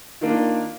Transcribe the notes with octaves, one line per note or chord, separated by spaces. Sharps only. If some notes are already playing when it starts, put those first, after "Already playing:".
D#3 A#3 D4 F4